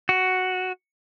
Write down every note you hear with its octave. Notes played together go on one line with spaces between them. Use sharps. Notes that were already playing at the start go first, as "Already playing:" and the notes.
F#4